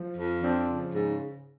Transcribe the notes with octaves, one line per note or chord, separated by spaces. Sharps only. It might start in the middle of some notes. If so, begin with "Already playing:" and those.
Already playing: F3
F2
F3 C4 D4
C#3
G#2